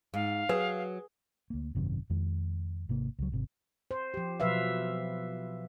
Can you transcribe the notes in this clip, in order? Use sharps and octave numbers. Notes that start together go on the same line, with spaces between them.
G#2 F5
F#3 G#4 B4
D2 A#3
G#1 F#2 C3 D#3
F2 D#3 G#3
G#1 C3 A#3
C#2 F#3
G#1 C3
C5
F3 G4
B2 F3 F#3 B4 E5 F5